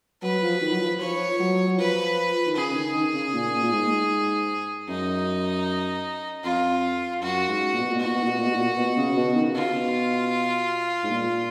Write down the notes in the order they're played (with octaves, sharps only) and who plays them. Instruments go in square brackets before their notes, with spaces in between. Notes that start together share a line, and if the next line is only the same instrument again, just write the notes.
[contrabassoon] F#3 [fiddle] B4
[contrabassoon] F3
D#3
F#3
F3
[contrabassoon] F3 [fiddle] C#5
[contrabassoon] F#3
F#3
[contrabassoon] F3 [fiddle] B4
[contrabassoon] D#3
[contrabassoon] C#3 [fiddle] G#4
[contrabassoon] D#3
D#3
C#3
A#2
A#2
G#2
[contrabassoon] F#2 [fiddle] D#4
[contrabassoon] F2 [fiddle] F4
[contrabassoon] F#2 [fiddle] F#4
[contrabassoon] G#2
A#2
B2
A#2
[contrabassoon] B2 [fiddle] F#4
[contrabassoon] A#2
B2
A#2
B2
A#2
B2
A#2
B2
C#3
B2
D#3
C#3
[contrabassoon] B2 [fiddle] F4
[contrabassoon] G#2
A#2